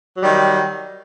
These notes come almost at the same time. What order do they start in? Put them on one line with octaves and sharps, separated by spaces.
F#3 G3 D#3